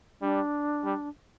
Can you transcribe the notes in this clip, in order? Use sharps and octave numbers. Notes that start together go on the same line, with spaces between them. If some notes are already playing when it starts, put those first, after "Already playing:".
G3 D4
G3